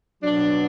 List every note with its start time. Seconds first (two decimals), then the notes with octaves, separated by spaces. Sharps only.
0.23 B2 F#3 D4